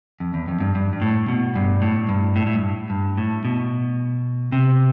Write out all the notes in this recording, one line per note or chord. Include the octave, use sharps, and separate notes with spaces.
F2
E2
F2
G2
G2
G2
A2
B2
G2
A2
G2
A2
A2
G2
G2
A2
B2
C3